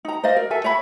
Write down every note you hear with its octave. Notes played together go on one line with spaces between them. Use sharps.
D#4 A#5
C5 D5 D#5 F5
A#4
A4 E5 G#5
C#5 E5 B5